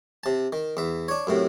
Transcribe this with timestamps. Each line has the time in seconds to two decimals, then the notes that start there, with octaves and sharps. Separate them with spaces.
0.24 C3 A5
0.53 D#3
0.77 E2 E5
1.08 D4 C#5
1.27 F#2 A2 C3